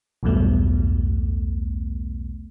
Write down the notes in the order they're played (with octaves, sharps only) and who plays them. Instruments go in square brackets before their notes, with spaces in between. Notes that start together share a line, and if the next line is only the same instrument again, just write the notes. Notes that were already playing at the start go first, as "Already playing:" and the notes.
[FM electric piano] B1 E2 G2 B2 A3